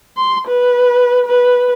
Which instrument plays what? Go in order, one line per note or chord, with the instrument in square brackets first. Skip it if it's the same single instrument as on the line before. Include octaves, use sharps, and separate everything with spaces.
[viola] C6
B4
B4